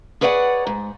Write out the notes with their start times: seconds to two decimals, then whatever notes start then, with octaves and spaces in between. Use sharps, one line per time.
0.21 G#4 B4 C#5 D5 F5 F#5
0.67 G#2